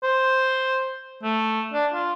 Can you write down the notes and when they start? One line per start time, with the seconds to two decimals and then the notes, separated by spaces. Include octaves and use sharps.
0.03 C5
1.23 A3
1.73 D4
1.94 F4